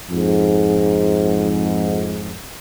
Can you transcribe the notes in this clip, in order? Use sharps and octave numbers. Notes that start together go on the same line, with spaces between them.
F2 G#2